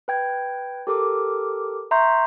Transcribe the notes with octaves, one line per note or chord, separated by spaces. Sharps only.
B4 G5 G#6
G4 A4 A#4 D6
E5 A#5 C6 C#6 G6